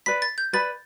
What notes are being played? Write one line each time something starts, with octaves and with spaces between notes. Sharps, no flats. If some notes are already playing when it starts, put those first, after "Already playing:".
B4 D5 B5 B6
A6
G6
B4 D5 B5 A6